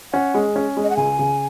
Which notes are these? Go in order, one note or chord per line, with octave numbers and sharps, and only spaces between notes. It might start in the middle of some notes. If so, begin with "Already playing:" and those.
C#4 F#5
G#3
C#4
G#3
D#5
F#5
C#2 G#5
C#3